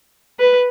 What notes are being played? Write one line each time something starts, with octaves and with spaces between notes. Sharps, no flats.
B4